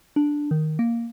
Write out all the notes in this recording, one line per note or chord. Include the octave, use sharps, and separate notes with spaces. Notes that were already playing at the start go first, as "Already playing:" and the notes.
D4
D#3
A#3